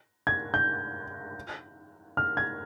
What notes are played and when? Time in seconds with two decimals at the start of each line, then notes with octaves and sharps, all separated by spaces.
0.27 G#6
0.54 G6
2.17 F6
2.37 G#6